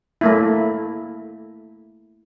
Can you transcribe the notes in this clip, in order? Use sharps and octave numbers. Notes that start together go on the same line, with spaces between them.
A3 A#3 E4